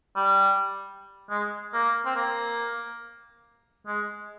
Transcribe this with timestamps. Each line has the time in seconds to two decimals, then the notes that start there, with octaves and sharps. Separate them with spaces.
0.16 G3
1.30 G#3
1.74 A#3
2.06 C4
2.16 A#3
3.87 G#3